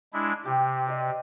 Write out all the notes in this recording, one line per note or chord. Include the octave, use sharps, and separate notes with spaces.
G#3 D4 E4
C3 G4
C5 D5 D#5